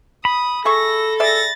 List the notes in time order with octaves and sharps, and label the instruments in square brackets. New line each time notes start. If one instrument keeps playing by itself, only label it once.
[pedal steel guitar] B5 [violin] D#6
[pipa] G#4 E5 C#6 [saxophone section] A4 [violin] A#6
[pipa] G#4 D5 E5 [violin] A6 A#6